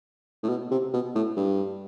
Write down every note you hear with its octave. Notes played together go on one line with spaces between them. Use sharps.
A2
B2
C3
B2
A2
G2